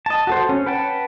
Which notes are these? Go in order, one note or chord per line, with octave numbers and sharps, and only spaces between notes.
D#5 A5
F#4 A4 C5
C#4
B4 F#5 G5 A5